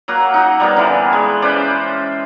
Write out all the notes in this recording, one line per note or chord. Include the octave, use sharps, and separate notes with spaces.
F#3 A#3 F#4
D#4 F#4
G3 A#3 B3
D3 E3
G#3
C#4 B4 C5 D5